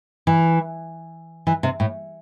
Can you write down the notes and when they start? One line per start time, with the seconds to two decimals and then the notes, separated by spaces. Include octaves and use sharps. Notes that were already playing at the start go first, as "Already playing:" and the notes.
0.27 E3
1.47 E3
1.63 C3
1.80 A2